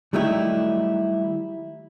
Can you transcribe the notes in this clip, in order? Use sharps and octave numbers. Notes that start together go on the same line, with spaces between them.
D#3 F#3 G3 A3 D#4 E4